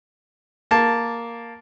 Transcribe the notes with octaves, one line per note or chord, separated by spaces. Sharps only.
A#3 A5